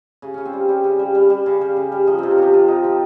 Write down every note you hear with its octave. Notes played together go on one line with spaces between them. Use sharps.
C#3
C#3 C#4
C4
G3
G3 C#4
C#3
G3
G3
G3
C#3
G3
C#3
G3
F3 D#4
C3 C4
C#4
C3 G4
F3 F4
C3 D#4
F3 C4